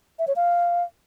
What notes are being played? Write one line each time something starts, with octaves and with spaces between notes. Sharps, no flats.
E5
C#5
F5